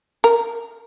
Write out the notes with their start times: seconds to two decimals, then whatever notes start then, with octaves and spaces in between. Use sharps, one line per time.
0.24 A#4